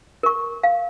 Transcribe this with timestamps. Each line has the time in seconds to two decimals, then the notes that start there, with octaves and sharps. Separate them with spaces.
0.23 A#4 C#6
0.63 F5